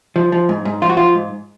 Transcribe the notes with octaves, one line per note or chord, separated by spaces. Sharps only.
F3
F3
G#2
G#2
F3 F4
F#4
F3 F4
G#2